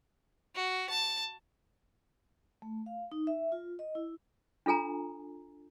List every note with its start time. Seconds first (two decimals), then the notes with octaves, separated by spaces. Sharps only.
0.55 F#4
0.90 A5
2.62 A3
2.86 F5
3.12 D#4
3.27 E5
3.52 F4
3.79 D#5
3.95 E4
4.66 D4 F4 A4 G#5 A#5